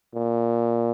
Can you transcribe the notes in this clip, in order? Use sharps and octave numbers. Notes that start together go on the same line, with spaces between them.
A#2